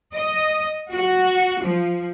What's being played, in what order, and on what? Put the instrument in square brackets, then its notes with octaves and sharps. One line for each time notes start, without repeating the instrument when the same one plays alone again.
[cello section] D#5
F#4
F3